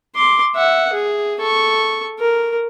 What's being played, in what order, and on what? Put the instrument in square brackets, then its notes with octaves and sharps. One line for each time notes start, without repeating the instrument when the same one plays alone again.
[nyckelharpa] C6 D6
E5 F#5
G#4
A4 C#6
A#4